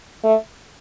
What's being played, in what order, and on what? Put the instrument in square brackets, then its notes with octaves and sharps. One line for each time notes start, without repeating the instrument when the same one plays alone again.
[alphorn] A3